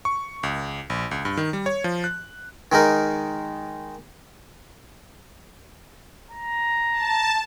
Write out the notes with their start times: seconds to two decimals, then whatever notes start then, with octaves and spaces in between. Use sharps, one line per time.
0.05 C#6
0.43 C#2
0.90 A#1
1.11 C#2
1.25 G2
1.37 D#3
1.53 G3
1.66 C#5
1.84 F3
2.04 F#6
2.72 D#3 G#3 D#4 A#4
6.30 A#5
6.92 A5